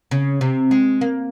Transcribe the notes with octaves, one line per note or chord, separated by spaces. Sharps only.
C#3
C3
G#3
A#3